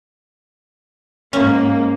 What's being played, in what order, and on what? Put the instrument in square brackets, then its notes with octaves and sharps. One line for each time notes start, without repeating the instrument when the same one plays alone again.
[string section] G#2 A#3 [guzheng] C#4